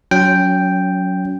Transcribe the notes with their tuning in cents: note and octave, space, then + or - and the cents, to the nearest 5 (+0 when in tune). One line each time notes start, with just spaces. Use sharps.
F#3 -5 C#4 +25 G5 +0